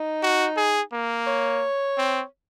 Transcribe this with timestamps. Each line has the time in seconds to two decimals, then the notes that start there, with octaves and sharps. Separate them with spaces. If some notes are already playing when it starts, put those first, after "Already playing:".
Already playing: D#4
0.23 F#4
0.57 G#4
0.93 A#3
1.27 C#5
1.98 C4